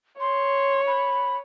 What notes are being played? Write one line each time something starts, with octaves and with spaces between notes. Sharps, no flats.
C#5 C6
B5